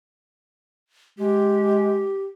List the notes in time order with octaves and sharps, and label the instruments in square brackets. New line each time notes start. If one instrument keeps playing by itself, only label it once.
[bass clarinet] G#3 [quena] G4